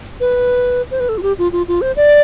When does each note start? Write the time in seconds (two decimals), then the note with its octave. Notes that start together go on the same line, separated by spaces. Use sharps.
0.20 B4
0.91 C5
1.00 B4
1.09 A4
1.18 F4
1.22 G4
1.38 F4
1.52 F4
1.68 F4
1.81 C5
1.96 D5